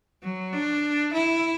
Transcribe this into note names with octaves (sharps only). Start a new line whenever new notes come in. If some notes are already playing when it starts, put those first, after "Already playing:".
F#3
D4
E4